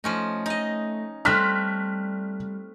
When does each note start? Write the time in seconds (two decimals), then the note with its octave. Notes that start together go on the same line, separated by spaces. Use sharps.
0.04 F3 A3 C#4 D#4
0.46 D#4 D#5
1.25 G3 A3 C4 F6 F#6 B6